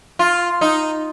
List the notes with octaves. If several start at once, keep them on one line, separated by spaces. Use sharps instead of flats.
F4
D#4